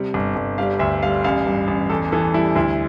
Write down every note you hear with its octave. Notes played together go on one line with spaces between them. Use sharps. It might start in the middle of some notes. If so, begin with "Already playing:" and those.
Already playing: C3 G3
G1
G1
G3 F5
D2 E5
G3 F5
A1 F5
G2
A1
E2 A4
E3 A4
G3 E4
D2 E4